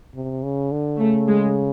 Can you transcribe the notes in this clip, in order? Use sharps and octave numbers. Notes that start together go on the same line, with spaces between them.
C3
C#3
D3
C#3 A3
G#3